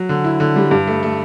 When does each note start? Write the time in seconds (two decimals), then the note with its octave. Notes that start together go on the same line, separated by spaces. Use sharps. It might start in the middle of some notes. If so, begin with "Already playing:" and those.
Already playing: F#3
0.09 D3
0.24 E4
0.40 D3
0.56 G3
0.71 G2
0.87 A3
1.03 A3